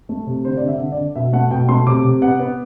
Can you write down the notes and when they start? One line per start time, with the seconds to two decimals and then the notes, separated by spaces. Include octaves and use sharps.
0.09 A3
0.27 C3
0.45 D3 C5
0.57 D5
0.62 D3
0.68 E5
0.80 D3
0.92 D5
0.97 D3
1.16 B2 E5
1.33 A3 F#5
1.51 B2 G5
1.69 A3 C6
1.87 C3 D6
2.04 C3
2.22 B3 F#5
2.40 B3